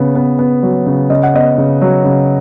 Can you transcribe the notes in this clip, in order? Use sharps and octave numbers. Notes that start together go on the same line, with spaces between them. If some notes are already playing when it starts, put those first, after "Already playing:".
Already playing: C#3 B3
B3
B3
F#3
C#3
C#3 D#5
F#5
B3 D#5
C#3
F#3
C#3